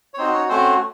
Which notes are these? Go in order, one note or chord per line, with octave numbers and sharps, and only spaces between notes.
C#5
C4 D#4 F#4 C5
C#4 C#5
A3 C4 C#4 F#4 C5